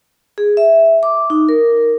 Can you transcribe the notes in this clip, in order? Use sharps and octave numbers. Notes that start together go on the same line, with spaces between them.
G#4
E5
D6
D#4
A#4